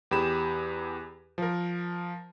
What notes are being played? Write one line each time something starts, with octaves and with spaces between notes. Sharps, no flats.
E2 G4 G#4 B5 E7
F3 A#4